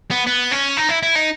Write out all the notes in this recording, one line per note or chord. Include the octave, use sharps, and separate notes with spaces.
B3
B3
C#4
D#4
E4
E4
D#4